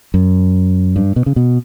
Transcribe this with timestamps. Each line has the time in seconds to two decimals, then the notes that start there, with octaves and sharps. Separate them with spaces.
0.14 F#2
0.96 G2
1.16 B2
1.26 C#3
1.36 B2